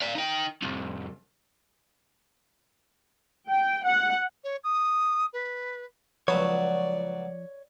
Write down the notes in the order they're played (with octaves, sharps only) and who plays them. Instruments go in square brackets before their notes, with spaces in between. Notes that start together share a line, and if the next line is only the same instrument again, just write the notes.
[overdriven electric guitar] D5 F5
D#4 G5
C2 F2
[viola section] G5
F#5
[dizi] C#5
D#6
B4
[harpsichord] C#2 F#3 B3 [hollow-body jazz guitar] F3 B5 [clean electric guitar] C#5 [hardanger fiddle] D5